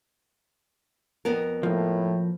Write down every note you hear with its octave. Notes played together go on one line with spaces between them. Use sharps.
F2 B3 A#4
A2 F3 A#3